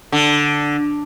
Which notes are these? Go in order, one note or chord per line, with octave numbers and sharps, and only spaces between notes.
D3